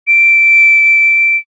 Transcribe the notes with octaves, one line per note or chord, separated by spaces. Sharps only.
D7